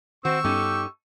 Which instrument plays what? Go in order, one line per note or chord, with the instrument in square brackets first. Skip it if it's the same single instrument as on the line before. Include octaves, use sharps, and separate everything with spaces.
[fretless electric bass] D#3 [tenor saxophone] C4 [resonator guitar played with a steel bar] F#4 [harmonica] C#6 E6
[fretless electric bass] G2 G3 B3 [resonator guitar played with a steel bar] C#4 D#4 A4 [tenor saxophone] G4